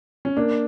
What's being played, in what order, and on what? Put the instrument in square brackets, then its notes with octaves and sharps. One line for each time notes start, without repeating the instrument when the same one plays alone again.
[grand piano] C#4
[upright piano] A#3 [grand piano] D4